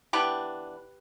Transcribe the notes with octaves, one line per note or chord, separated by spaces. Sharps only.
E3 B3 D4 G4 B4